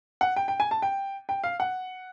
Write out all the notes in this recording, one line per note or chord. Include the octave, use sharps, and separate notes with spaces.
F#5
G5
G5
G#5
A5
G5
G5
F5
F#5